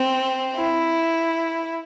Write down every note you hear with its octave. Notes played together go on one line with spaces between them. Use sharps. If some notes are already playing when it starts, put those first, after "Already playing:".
Already playing: C4
E4